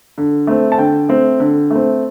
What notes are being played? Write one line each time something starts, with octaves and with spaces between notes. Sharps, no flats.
D3
A3 C4
A5
D3 G5
A3 C4
D3
A3 C4